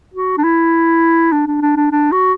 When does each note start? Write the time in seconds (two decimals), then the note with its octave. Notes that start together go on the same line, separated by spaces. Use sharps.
0.14 F#4
0.38 D4
0.44 E4
1.32 D4
1.47 D4
1.61 D4
1.77 D4
1.92 D4
2.12 F#4